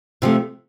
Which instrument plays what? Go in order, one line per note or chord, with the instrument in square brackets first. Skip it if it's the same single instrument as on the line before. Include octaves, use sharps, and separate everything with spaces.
[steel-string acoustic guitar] C3 F3 A3